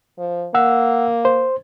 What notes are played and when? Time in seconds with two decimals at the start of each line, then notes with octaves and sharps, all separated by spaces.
0.18 F3
0.54 A#3 F#5 E6
1.25 C5